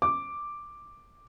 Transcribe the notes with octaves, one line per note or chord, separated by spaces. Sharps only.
D6